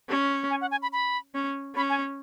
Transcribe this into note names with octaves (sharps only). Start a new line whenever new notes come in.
C#4
G#5
F#5
G#5
B5
B5
C#4
C#4 B5
G#5